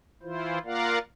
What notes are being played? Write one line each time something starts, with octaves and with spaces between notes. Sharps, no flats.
E3 E4 F4 C5
A#3 F4 A#4 D5 F5 F#5